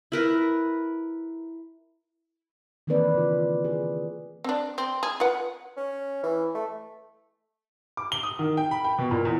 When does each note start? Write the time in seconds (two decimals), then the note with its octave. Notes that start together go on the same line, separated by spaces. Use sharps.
0.12 E4 A#4 B4
2.87 D#3 E3 A#3 C4 B4 D5
3.15 C#3 F4
3.65 G#4
4.44 C4 D4
4.78 C4
5.03 G#4
5.20 F4 B4 F#5
5.77 C#4
6.23 E3
6.55 A3
7.97 D6
8.12 G7
8.23 D#6
8.39 D#3
8.57 G5
8.71 B5
8.84 G5
8.98 B2
9.11 A#2
9.25 E2